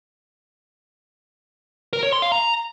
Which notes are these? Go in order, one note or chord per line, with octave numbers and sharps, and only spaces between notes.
A#4
C#5
C6
F5
A#5